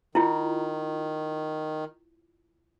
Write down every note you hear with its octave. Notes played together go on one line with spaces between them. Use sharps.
D#3 E4 F4